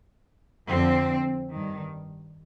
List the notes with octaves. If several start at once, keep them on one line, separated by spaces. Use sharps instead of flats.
F2 D3 F3 C4
G2 D#3